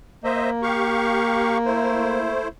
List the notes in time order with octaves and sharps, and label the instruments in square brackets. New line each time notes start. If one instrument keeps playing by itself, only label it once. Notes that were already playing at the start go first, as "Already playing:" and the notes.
[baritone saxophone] A#3 [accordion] C5 D#5 E5
[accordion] G4 F5 C#6
A3 E4 C5